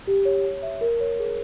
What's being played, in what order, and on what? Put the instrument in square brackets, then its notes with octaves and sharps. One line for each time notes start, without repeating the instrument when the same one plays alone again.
[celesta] G4
C#5
C#5
E5
A#4
C#5
G#4